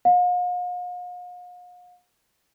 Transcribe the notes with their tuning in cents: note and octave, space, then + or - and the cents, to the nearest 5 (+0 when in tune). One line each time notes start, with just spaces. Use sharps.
F5 +45